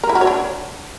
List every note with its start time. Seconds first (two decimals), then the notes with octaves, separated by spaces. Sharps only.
0.03 A#4
0.09 E4
0.15 F#4
0.21 C#5
0.27 D4